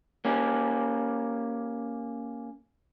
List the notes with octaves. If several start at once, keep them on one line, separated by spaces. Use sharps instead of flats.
A#3 C#4 G4